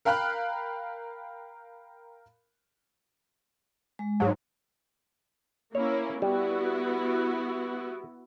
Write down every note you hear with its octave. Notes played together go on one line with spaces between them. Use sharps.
A#4 F5 G5 B5 F6 F#6
G#3
G#2 F#3
A#3 C#4 E4 C#5
G3 B3 E4 F#4